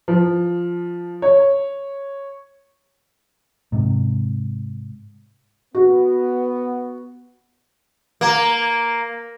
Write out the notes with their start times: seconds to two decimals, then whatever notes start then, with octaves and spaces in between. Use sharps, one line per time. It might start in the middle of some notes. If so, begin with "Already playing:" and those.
0.08 F3
1.22 C#5
3.72 G#2 C3
5.75 B3 F#4
8.21 A#3